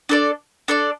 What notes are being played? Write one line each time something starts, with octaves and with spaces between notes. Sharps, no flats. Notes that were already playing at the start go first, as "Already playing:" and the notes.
D4 A4 D5
D4 A4 D5